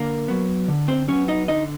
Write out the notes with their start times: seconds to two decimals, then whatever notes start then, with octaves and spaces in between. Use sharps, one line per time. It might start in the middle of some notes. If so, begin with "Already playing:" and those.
Already playing: D3 A#3 A#4
0.28 F#3 B3
0.68 D3
0.88 C4 C5
1.08 F#3 B3 C#4 C#5
1.28 D#4 D#5
1.48 D3 D#4 D#5